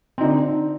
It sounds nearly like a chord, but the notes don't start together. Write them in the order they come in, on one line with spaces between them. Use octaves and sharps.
C4 D#4 D3